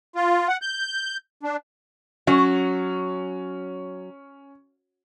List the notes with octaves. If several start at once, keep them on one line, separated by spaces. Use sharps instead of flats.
F4
F#5
G6
D4
F#3 C#4